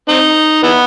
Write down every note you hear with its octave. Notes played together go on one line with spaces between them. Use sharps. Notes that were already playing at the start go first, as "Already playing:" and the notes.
C4 D#4
E3 B3